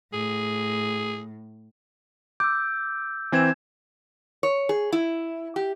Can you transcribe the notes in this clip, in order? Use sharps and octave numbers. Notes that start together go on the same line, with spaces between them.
A2 G#4
D6 E6 G6
E3 C4 G#5 G#6 E7
C#5
G#4
E4
G4